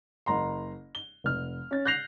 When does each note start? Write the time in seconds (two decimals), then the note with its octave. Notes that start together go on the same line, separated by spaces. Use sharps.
0.26 F#1 A#5 C6
0.95 G7
1.24 F1 F6
1.71 C#4 A6
1.85 F#6 G6 A#6 C7 F7